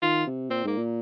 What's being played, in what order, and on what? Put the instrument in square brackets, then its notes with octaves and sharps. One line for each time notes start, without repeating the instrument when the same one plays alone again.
[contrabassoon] D#3 [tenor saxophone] F4
[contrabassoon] C3
[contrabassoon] A#2 [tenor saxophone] C4
[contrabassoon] G#2 [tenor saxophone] A#3
[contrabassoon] A#2